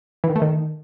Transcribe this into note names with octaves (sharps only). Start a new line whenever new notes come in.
E3
D#3
A3
D#3